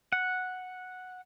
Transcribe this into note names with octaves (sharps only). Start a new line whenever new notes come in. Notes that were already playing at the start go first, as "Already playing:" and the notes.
F#5